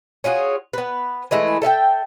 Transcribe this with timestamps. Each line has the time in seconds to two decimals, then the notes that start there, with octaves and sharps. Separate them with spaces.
0.24 C#4 F4 F#4 G#4
0.73 B3 B4
1.31 E3 G#3 A3 E4
1.62 A4 E5 F5 G5